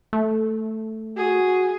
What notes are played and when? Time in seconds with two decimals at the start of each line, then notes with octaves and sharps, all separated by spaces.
0.13 A3
1.17 F#4 G#4